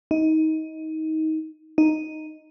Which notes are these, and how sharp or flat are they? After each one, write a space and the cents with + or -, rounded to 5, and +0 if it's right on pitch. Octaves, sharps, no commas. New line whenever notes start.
D#4 +20
D#4 +0